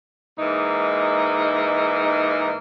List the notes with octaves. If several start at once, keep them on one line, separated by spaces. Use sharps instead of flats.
G#2 E3 G#3 A#3 D#4